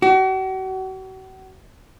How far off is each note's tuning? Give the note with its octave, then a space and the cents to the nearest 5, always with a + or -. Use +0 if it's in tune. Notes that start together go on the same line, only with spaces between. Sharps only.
F#4 +40